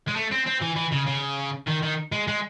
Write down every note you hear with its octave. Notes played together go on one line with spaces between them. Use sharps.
G#3
A3
C4
C4
E3
E3
C#3
C#3
D#3
D#3
G#3
G#3